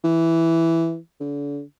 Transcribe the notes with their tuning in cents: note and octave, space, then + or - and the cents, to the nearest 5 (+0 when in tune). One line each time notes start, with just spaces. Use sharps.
E3 +0
D3 -40